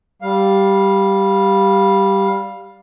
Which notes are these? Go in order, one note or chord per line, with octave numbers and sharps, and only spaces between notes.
G3 F5